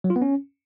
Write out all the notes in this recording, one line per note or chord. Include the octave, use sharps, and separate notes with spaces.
F#3
F4
B3
C#4